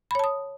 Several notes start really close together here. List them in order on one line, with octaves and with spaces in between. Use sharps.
B5 C#5 A5 D#6